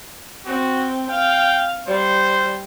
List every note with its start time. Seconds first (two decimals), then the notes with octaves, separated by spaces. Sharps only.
0.46 C4 F#4
1.10 F5 G5
1.87 G3 C5